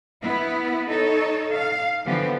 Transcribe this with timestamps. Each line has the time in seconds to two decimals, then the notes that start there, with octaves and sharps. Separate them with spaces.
0.23 B3 E4
0.90 D#4 A4 C#5
1.52 F5
2.06 D3 E3 F3 B3 G4